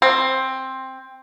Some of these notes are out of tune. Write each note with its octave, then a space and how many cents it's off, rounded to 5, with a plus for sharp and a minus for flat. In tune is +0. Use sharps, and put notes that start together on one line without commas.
C4 +10